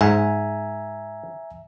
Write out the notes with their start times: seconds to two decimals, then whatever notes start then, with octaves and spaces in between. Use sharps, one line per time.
0.01 G#2 E5 G#5 A#5